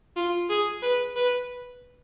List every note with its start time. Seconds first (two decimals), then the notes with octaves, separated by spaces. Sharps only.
0.16 F4
0.49 G#4
0.82 B4
1.16 B4